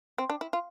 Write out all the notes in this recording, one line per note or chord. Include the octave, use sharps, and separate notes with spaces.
C4
D4
E4
F4